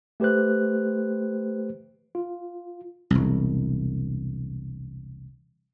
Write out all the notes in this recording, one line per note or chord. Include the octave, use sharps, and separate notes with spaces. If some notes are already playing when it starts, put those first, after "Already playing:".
A3 G4 B4 C5 F#6
F4
E1 C2